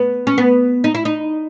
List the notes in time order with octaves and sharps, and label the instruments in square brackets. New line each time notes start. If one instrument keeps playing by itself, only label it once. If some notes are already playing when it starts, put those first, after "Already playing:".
Already playing: [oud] B3
C#4
B3
D#4
E4
D#4